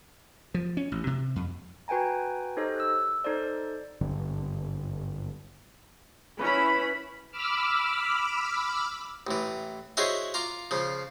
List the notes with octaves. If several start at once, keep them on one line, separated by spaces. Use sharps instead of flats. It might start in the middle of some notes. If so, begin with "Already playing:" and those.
F3
C#4
A1
C3
F2
F#4 B4 G5 G#5 A#5
D#4 G4 A4 C5 C#5 D#5
E6 F#6
D#4 A4 C5 D5
G#1 G2 D3 G3
C#4 E4 B4 B5
B5 D6 E6 F6
A1 E3
E4 F#4 G#4 C5 C#5 D#5
F4 A#5 D6
C#3 F3